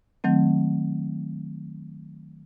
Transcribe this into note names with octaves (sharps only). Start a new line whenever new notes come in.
D#3 F#3 A3 C4